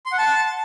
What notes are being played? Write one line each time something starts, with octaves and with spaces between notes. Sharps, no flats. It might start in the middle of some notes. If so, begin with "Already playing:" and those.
C6
F#5
A5